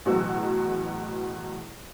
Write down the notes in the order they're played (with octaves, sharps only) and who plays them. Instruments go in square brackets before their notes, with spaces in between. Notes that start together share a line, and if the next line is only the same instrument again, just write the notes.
[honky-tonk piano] A1 B2 F#3 F#4 G#4 E6